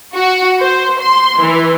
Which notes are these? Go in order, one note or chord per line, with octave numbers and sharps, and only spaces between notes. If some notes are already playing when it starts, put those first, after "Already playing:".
F#4
C5
C6
E3